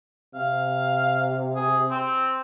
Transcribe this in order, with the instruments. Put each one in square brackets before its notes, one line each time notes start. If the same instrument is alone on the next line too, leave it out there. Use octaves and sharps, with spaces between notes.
[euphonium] C3 [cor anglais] F5
[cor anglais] G#4
C4